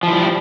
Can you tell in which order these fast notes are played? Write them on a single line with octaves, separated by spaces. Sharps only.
F3 E4 G3